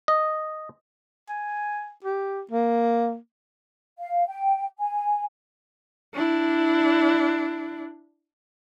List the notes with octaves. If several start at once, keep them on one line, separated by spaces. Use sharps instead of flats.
D#5
G#5
G4
A#3
F5
G5
G#5
D4 E4